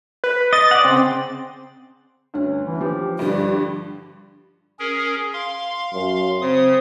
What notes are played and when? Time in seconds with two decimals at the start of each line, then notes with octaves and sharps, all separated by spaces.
0.24 B4
0.53 D#5 A6
0.71 D5 F#5
0.85 C#3 C4
2.34 D2 G2 C#4
2.67 E3
2.81 F3 G4
3.19 G2 D3 G3 G4
4.79 C#4 G#4 A#4
5.33 F5 C6
5.94 F#2
6.41 C#3 C4 D#6